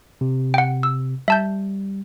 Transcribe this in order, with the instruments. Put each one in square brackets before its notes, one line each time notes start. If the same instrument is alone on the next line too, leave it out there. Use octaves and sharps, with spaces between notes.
[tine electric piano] C3
[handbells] F#5 G5
E6
[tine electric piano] G3 [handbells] E5 A5 G6